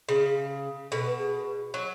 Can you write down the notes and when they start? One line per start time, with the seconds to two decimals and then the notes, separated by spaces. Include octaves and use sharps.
0.09 C#3 G#4
0.91 B2 A4
1.05 B4
1.19 G#4
1.74 F#3